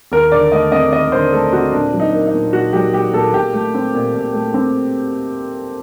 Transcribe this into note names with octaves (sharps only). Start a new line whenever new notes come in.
D#2 A#4
D3 D5
A3 D#5
C4 D#5
D#2 D#5
D3 C5
A3 A4
C4 F#4
A#2 D4
F#3
D#4
A#3
D#4
A#2
A#2 F#4
F#3 G4
A#3 G4
A#2 A4
A#2 G4
A3
C4
A#2
A#2
A3
C4